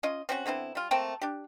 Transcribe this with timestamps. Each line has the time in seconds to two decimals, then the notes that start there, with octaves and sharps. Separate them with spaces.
0.03 C#4 F4 D#5
0.29 C4 C#4 F#4
0.46 D3 B3 C4 E4
0.75 G3 F4
0.91 A3 A#3 C4 G5
1.21 D4 G4